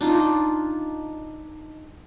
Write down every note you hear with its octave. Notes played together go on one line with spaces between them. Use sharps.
D4 D#4 F4